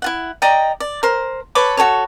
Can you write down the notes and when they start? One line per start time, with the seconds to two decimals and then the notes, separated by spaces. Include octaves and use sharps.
0.02 E4 F4 F#5
0.42 D5 D#5 G5 A#5
0.80 D5
1.03 A#4 C5
1.55 A4 B4 C#5 D6
1.77 F#4 G#4 A4 C#5